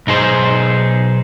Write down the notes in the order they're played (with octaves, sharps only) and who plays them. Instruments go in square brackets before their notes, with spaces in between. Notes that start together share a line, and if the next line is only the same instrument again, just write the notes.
[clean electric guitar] B1 D#4 G#4 C5